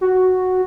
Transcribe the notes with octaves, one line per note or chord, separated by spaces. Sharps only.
F#4